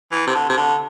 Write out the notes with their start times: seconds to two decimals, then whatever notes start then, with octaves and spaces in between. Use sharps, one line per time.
0.12 E3
0.27 C3
0.35 D3
0.50 C3
0.57 D3